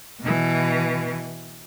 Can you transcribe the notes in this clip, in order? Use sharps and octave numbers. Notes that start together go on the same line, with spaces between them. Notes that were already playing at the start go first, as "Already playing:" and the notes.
B2 E3